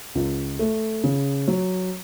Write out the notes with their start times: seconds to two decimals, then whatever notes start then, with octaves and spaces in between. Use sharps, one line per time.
0.15 C#2
0.59 A3
1.04 C#3
1.48 F#3